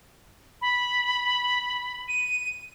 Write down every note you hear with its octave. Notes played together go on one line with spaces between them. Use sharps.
B5
D#7